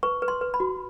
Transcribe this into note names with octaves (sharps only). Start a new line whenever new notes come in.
B4 C#6
B4
C6
B4
B5
F#4